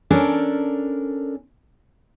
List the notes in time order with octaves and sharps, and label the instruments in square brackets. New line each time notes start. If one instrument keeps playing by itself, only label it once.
[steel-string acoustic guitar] C#4 D4 A4 A#4